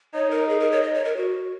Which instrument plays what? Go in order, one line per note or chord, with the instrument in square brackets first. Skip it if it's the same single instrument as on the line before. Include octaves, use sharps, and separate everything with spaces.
[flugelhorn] D#4 [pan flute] C#5
[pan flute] A#4
G#4
A#4
C#5
D#5
C#5
A#4
F#4